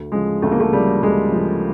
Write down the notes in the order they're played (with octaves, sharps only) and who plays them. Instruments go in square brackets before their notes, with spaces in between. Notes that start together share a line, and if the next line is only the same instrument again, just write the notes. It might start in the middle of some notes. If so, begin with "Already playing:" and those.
Already playing: [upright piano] D2
C#3 F3 G#3
D2 A3
A#3
A3
C#3 F3 G3
D2 G#3
C#3 F3